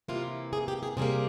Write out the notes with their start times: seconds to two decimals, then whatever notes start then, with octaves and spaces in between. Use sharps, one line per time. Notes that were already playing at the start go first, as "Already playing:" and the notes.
0.08 C3 E3 A#3 F4
0.53 G#4
0.68 G4
0.83 G#4
0.97 C3 G3 A#3 G#4